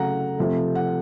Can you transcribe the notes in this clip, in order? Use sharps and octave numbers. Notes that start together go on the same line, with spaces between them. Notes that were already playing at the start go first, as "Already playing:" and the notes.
Already playing: C#3 F#3 A3 F#5 A#5
C3 F3 A3
F#5